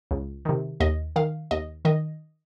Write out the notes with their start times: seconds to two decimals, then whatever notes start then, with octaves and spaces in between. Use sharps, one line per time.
0.11 C#2
0.45 C3 D#3
0.80 D#2 D#5
1.16 D#3 F5
1.51 D#2 D#5
1.85 D#3 D#5